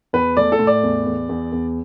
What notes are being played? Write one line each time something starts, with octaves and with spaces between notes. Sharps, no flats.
E2 B4
A3 D5
A4
A2
D5
E2
E2
E2
E2